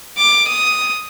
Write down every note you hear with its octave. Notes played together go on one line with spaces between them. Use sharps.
D6
D#6